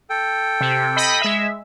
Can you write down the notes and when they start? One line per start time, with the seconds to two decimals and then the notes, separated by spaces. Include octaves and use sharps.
0.10 A4 G5
0.61 C3
0.96 D#5 B5
1.21 G#3 E5